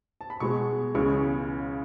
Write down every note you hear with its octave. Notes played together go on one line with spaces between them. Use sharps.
A5
B5
B2 G#3 B3 C#6
C#2 C#3 E3 G#3 B3 C#6